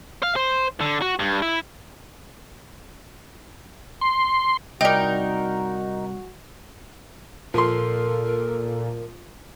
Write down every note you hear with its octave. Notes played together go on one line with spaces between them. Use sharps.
F5
C5
D3
F#4
G2
E4
C6
C2 D#4 F#4 A#4 D5 G5
A#2 F3 A4 A#4 C6